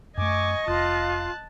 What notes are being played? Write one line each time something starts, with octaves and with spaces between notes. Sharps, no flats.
F#2 A3 D#5 G#5 C#6 D6
F1 F4 F5 A5 F#6